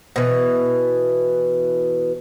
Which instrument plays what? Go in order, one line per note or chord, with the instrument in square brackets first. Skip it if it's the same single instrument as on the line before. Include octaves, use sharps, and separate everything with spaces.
[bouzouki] B2 E3